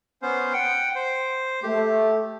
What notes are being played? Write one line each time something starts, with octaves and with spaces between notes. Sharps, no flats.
B3 C#4 C5
F#5 G5
C5
A3 G4